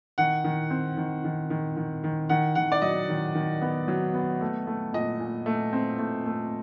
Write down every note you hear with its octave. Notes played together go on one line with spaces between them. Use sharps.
D#3 F#5
D#3
C4
D#3
D#3
D#3
D#3
D#3
D#3 F#5
D#3 F#5
D5
F#3 D#5
D#3
D#3
B3
F#3
B3
A3
A3
A#2 D#5
A#2
A3
C4
A3
A3